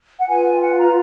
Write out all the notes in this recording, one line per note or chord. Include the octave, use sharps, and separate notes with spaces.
F#5
F4 B4 G#5
G#5
F#5
A#5